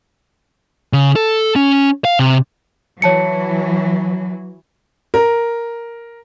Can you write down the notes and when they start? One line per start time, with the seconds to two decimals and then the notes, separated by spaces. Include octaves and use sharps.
0.93 C#3
1.16 A4
1.56 C#4
2.05 F5
2.19 C3
3.02 E3 F#3 C#5 A5 C#7
5.14 A#4